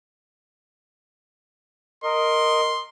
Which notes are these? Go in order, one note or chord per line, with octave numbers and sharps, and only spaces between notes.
A#4 D#5 C6